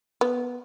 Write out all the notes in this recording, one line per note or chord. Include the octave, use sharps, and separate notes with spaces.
B3